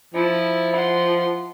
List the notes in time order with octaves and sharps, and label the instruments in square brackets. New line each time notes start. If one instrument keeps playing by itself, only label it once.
[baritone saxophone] F3 [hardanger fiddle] E4
[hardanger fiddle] F#5 C6